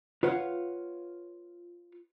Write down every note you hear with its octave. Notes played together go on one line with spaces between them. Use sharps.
F4 B4 C#5 F5 F#5